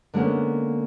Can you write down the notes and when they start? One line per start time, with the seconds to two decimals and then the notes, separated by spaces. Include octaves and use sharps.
0.14 D3 G#3 A#3 B3 C#4